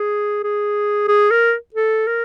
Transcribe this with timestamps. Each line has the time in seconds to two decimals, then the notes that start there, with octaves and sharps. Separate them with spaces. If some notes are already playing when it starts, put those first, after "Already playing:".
Already playing: G#4
0.43 G#4
1.08 G#4
1.30 A#4
1.74 A4
2.07 A#4